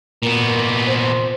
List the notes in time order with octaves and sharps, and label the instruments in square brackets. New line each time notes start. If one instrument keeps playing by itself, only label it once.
[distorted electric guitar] A#2 B3 [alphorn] A#4
[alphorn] C5